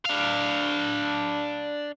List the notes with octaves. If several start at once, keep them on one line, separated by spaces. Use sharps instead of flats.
D4 F5